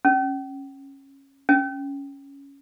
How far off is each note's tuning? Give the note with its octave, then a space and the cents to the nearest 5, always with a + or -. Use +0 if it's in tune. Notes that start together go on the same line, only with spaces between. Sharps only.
C#4 -15
C#4 +0